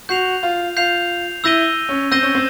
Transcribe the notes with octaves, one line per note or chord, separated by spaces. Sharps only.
F#4 G6 C7 F7
F4
F4 G6 C7 F7
E4 E6 G6 A#6 D#7 G7
C#4
C4 E6 G6 A#6 D#7 G7
C#4
C4